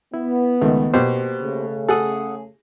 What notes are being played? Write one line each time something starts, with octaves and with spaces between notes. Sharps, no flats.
B3 E4
C#2 D#3 A3
B2 A#3 G4 C5
C#3 A3
G#4 A4 F#5 D#6